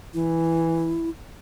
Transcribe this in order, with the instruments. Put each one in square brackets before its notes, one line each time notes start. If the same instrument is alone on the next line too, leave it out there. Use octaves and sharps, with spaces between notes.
[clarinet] E3 [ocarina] E4